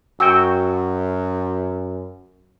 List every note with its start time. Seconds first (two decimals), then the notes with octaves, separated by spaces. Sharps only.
0.20 F#2 F#4 G5 E6